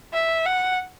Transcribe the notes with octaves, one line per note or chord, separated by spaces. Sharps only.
E5
F#5